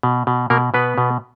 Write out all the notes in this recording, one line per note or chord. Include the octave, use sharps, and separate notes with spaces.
B2
B2
B2 A#3 A#4
B2 B3 B4
B2